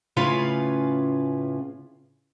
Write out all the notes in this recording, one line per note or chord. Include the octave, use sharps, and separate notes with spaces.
A2 C#3 C#4 F4 B4 F5